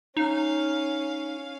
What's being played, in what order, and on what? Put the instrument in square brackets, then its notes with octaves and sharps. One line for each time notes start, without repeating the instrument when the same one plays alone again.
[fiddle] C#4 F5 [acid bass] D#4